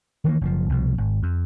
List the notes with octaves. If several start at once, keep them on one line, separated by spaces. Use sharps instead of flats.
D#3 E3 G#3 A#3
F#1 B2 F3
C2 B2 F3
G#1
F2